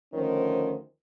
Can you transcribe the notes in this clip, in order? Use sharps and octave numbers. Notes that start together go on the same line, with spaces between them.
D2 D#3 F3 C#4 C5